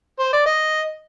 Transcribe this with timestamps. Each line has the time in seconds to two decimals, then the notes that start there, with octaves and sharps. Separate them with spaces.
0.19 C5
0.33 D5
0.46 D#5